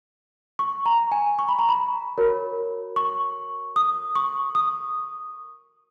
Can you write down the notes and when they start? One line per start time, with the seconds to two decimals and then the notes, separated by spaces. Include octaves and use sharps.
0.59 C#6
0.86 A#5
1.12 G#5
1.39 C#6
1.48 B5
1.59 A#5
1.69 B5
2.18 F#4 A#4 C#5
2.96 C#6
3.76 D#6
4.16 C#6
4.55 D#6